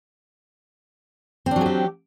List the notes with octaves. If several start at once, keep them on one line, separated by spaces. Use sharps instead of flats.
F#3 C4 D4 G4 G#4